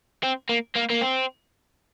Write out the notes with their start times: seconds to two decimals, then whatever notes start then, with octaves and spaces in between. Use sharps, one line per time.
0.24 C4
0.49 A#3
0.75 A#3
0.90 A#3
1.01 C4